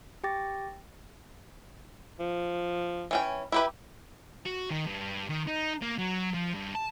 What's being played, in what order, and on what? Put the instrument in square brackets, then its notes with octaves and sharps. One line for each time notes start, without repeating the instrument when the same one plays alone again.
[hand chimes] G4 G5 D6 A6 A#6
[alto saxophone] F3
[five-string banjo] E3 C#4 G5
[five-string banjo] E4 G4 B4 [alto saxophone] E5
[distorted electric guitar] F#4
D#3
G2
D#3
D#4
A#3
F#3
F3
G2
A5